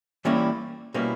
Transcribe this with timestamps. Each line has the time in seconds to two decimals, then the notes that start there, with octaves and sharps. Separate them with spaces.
0.25 E3 G3 A#3 C#4 E4
0.94 B2 G3 A#3 C#4 E4